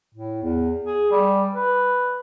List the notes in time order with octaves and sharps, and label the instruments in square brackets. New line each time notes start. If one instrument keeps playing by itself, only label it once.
[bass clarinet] A2
E2
G#4
G3
B4